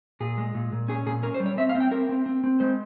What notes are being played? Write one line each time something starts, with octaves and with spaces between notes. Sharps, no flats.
A#2 G#4
G#3
A#2
A#2
C#4 G#4
A#2 G#4
C#4 A#4
C5
G3
C#5
C4 E5
F5
C4
G5
C4 A#4
C4
C4
C4
G#3 C5